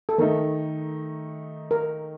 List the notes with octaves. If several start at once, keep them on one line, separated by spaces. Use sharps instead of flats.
A4
D#3 A3 D#4 A#4
A#4